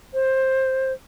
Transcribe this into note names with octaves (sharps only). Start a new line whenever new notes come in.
C5